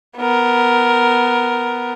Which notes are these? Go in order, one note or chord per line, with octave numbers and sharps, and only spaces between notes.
B3 A#4